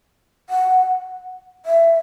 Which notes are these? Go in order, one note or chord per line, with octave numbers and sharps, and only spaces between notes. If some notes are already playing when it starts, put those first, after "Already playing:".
F#5
E5